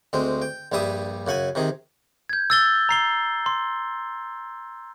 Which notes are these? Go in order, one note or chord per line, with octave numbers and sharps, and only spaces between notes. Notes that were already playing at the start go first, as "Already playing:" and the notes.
D2 G#3 C4
G5
A#1 G2 G3 E5 D#6
F#2 C#3 F#5 G#5
C3 D#3 G#4
G6 G#6
E6 A6 G7
A#5 C7 G7
C6